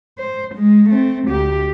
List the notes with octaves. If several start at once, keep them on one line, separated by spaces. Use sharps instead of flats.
C5
G#3
A3 C4
D2 G4